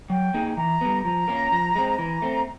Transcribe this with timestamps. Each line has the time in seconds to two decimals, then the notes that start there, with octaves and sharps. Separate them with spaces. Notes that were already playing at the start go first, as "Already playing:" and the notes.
0.10 F#3 G5
0.34 A#3 D#4 G#4
0.57 E3 A#5
0.81 G3 B3
1.04 F3 A#5
1.28 A#3 C#4 F4 A#4
1.52 F3
1.76 G#3 C4
1.99 E3 A#5
2.22 A3 C4